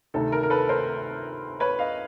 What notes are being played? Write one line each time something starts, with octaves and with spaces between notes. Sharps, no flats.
D2 C3 D#3 A4
A#4
A#4
A4 B4
A#4 C5
B4 C#5
D#5 F5